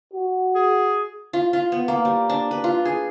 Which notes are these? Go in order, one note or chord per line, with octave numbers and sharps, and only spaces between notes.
F#4
G#4
F4
F4
B3
A#3
G3
D4
B4
F4
G#4